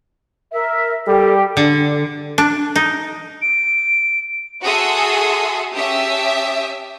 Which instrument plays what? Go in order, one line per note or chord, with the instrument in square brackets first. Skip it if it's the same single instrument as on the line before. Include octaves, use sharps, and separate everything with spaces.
[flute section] A#4 E5
[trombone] G3 [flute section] G4 [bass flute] A4
[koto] D3
D4
D#4
[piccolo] D7
[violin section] F#4 G#4 A4 E5 C6 D#6
C#4 G4 E5 A5 D#6